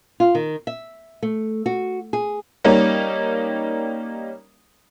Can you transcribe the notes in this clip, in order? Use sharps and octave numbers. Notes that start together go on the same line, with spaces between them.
F4
D#3
E5
A3
F#4
G#4
G3 A#3 C#4 D#4